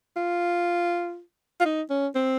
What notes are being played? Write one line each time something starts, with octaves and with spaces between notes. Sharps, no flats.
F4
F4
D#4
C#4
C4